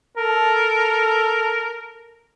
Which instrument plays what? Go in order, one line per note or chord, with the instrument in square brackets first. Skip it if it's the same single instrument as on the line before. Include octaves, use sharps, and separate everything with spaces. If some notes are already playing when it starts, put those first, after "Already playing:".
[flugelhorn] A4 [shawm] A#4